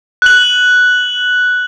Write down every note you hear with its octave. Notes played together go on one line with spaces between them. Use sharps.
F#6 F#7